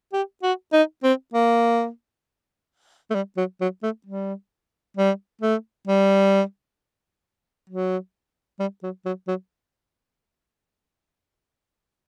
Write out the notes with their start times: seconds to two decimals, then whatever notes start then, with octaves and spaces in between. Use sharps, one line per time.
0.13 G4
0.43 F#4
0.73 D#4
1.04 C4
1.34 A#3
3.11 A3
3.15 G3
3.37 F#3
3.61 F#3
3.83 A3
4.06 G3
4.97 G3
5.42 A3
5.87 G3
7.70 F#3
8.60 G3
8.83 F#3
9.05 F#3
9.28 F#3